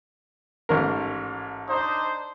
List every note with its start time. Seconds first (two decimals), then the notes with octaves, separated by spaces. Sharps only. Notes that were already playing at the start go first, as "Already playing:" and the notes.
0.69 A1 G#2 A#4
1.69 D4 D#4 C5